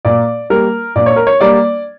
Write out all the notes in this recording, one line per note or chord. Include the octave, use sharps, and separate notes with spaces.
A#2 D5
G3 A#3 A#4
A#2 D5
C#5
A#4
C#5
G3 A#3 D5